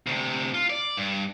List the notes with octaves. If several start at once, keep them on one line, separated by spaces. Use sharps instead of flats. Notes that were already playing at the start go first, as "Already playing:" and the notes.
D2 C3
F4
D5
G2